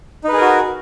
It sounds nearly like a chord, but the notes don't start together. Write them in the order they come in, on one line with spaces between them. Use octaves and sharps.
D#4 B4 G#4 A#4 F#4